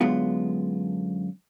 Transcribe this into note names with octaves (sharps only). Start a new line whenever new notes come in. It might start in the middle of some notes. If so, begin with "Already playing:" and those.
F#2 D3 G#3 B3 F4